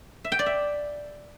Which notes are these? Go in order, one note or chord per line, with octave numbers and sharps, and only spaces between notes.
E5
G5
D5
E5